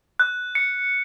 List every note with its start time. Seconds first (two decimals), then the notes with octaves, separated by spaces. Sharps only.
0.20 F#6
0.55 C#7